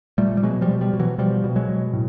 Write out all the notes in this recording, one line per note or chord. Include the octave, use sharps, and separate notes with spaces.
A#2 G3 A3
G3
B2 F#3 G#3
F3 G3
B2
F3 G3
B2
E3 F#3
B2 F3 G3
B2
F#3 G#3
B2
A2